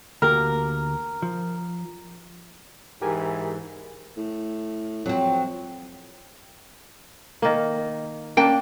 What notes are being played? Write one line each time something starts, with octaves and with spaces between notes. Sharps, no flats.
D2 A#3 G4 A#4
F3
G#2 E3 G4 A#4 G#5
A2
F2 F#3 C4
D#3 A#3
A#3 C#4 D4 G5 A5